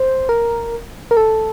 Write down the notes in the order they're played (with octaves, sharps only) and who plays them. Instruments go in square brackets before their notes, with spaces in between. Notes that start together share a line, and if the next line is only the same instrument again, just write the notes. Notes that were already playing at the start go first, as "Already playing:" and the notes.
Already playing: [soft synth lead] C5
A#4
A#4
A4